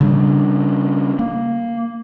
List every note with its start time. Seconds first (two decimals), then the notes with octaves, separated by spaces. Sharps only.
0.01 C#3 G3 D4
1.19 A#3